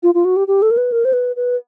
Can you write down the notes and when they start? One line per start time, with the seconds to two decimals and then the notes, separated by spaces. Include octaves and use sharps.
0.03 F4
0.15 F4
0.25 F#4
0.36 G4
0.48 G4
0.62 A4
0.71 A#4
0.77 B4
0.92 A#4
1.05 C5
1.13 B4
1.36 B4